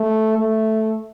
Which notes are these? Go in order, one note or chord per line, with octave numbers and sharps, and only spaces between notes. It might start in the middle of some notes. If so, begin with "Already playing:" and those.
Already playing: A3
A3